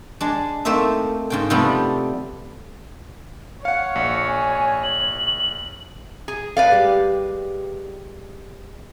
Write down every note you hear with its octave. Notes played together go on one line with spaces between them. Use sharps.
G#3 D4
A3 A#3 C4 D#4 E5
G#2 C#3 G5
C3 F3 G3 A3 B3
C#5 F5 F#5 C#7
A#1
G#5
F#7
G#4
A4 B4 D5 F5
G3 G#3 G4